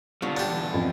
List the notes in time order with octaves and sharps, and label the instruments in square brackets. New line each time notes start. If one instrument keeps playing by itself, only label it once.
[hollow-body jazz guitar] B2 D3 [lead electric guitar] G3 F4
[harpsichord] D4 G4
[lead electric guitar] E2
[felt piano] F2